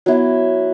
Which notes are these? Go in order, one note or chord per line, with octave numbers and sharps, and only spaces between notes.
F#3 B3 E4